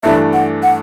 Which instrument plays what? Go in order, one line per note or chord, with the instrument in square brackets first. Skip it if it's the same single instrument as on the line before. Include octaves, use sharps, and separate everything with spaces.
[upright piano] G2 E3 A3 D4 [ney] E5
[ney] F#5
F#5